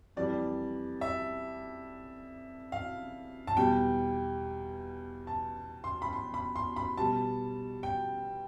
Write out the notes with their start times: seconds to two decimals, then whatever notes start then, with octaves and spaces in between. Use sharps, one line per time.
0.16 F2 E3 G3 D5
1.01 E5
2.72 F5
3.47 A5
3.57 E2 B2 G3 G5
5.27 A5
5.84 C6
6.02 B5
6.13 C6
6.34 B5
6.56 C6
6.76 B5
6.98 B2 G3 A5
7.83 G5